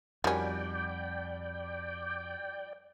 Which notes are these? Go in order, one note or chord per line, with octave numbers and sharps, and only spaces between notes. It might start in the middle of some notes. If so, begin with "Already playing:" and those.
F2 D#3 F3 G3 C#4 F#4 D5 G5